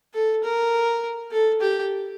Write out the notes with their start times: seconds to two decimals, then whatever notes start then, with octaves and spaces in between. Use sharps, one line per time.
0.14 A4
0.44 A#4
1.31 A4
1.61 G4